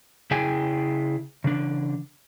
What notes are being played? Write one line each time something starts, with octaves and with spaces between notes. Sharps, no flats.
C#3 E4 G#4 G5 G#5
C#3 E3 D4